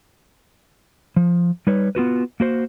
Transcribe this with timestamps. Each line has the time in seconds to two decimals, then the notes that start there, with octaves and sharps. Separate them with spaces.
1.16 F3
1.67 G3 D#4 B4 C#5
1.95 B3 F4 F#4 B4
2.40 A#3 F#4 C5